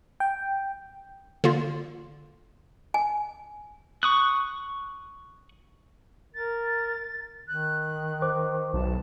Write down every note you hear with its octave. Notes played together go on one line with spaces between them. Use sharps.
G5
D3 A#3 F4
G#5
C#6 D#6 F#6
A#4 A6
D#3 F#6
C5 D6
B1 A5